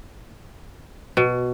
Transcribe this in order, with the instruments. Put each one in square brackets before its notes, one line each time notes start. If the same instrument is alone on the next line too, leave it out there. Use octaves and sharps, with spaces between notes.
[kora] B2